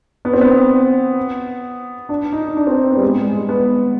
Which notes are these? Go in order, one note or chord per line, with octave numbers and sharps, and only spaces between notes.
B3
C4
B3
D4
D#4
D4
C4
B3
G3
G#3
G#3
G#3
B3